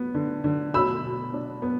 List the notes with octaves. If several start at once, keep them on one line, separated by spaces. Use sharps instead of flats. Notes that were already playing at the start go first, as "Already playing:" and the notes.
Already playing: B3
D3
D3
B2 B5 E6
B2
D4
B3